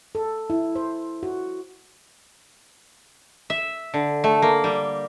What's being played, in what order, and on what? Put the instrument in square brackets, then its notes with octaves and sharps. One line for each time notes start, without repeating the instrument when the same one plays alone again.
[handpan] A4
E4
C5
F#4
[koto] E5
D3
A3
A#3
G3